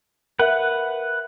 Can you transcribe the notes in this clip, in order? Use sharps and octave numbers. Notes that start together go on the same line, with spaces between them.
A#4 B4 E5 F#5